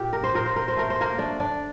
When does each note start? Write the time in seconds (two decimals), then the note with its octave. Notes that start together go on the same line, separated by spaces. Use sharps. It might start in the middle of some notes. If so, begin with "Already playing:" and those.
Already playing: A#2 G4
0.13 A#4
0.24 C5
0.34 A#2 A#4
0.46 C5
0.56 A#4
0.68 C5
0.76 A3 A#4
0.90 C5
1.01 A#3 A#4
1.18 A3 D4 D5
1.40 D4 D5